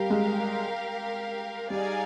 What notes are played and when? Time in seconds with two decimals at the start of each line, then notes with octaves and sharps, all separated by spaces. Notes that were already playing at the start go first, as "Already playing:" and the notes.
Already playing: G3 G4 A#4 F5
0.10 G#3
1.70 G3 D#4 G#4 D5 F5 G#5